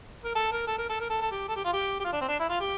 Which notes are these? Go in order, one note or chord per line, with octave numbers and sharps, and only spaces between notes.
A#4
A4
A#4
A4
A#4
A4
A#4
A4
A4
G4
A4
G4
F4
G4
G4
F4
D4
C4
D4
E4
F4
G4